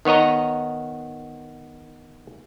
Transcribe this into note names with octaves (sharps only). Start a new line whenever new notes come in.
D#3 B3 C#5 D#5 A#5